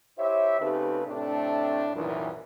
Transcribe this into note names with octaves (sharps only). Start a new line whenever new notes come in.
E4 G4 C5 C#5 E5
C#3 A3 C4 D#4 G4 B4
A2 C3 A3 C4 D4
C2 F#2 A#2 D#3 E3